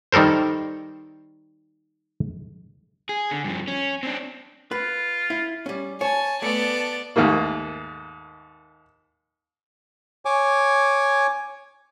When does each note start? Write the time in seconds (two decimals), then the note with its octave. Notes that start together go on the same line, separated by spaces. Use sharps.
0.12 D#3 G3 A4 A#4 C5
3.09 G#4
3.31 D3
3.44 G2 F3
3.68 C#4
4.03 C4 D4
4.71 F4 B4
5.30 E4
5.66 G3 C#4
6.01 C#5 G#5 A5
6.42 A3 B3 D5
7.16 D#2 G#2 A3 A#3
10.25 C#5 G#5 D6